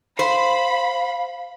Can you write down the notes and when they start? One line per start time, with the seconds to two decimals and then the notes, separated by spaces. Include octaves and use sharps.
0.19 C5 F5 B5